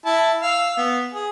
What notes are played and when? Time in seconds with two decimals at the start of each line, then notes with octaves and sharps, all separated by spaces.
0.06 E4 A5
0.42 F5 E6
0.77 B3
1.14 G#4